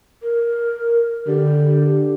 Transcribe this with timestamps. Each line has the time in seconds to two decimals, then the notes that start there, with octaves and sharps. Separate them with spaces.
0.23 A#4
1.27 D3 G4